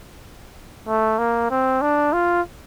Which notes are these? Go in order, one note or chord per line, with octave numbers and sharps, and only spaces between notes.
A3
A#3
C4
D4
F4